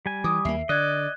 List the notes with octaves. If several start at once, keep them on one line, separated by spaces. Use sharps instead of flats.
G3 G#5
E3 D6 D#6
D#2 A#3 E5 C7
D3 D5 D#5 F#6 G#6